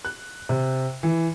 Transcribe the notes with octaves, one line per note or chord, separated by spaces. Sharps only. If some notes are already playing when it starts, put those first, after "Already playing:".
F#6
C3
E3